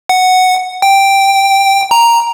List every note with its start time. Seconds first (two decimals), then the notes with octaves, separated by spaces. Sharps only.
0.09 F#5
0.82 G5
1.91 A#5